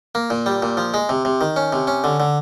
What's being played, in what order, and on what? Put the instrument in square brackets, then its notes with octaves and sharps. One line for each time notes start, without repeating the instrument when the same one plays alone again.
[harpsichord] A#3
A#2
G3
A#2
F3
G#3
C3
C3
D#3
C#4
C3
C#4
D3
D3